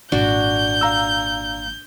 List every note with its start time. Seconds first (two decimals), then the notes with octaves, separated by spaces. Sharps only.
0.12 G#1 A#2 D4 F#4 D5 G6
0.81 F5 A#5 E6